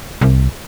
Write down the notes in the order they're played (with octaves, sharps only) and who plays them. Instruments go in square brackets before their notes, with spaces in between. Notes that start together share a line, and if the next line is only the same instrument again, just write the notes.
[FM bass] C2